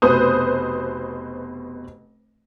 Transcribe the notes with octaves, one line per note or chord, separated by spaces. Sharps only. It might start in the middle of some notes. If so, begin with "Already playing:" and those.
F1 B2 B4 C5 D#6